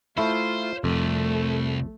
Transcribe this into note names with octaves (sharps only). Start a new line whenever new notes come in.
A3 E4 F4 C5
C2 F2 A3